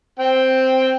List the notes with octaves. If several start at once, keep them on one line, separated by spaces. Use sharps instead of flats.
C4 G5